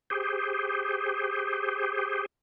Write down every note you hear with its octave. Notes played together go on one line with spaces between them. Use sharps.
G4 G#4 C5